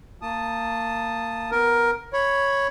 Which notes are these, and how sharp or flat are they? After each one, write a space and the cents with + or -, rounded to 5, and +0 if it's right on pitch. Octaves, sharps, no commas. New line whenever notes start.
A#3 -20 A5 +0 D#6 -10
B3 +0 A#4 +10
C#5 +0 B5 +0